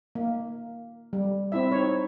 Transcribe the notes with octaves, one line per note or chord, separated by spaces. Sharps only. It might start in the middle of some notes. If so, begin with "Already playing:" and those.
A#3
G3
C4 E4 E5
D#4 C#5